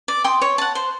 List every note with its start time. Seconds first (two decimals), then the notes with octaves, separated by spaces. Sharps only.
0.08 D5
0.24 G5 C6 D#6
0.41 C#5
0.58 F#5 A5
0.75 C5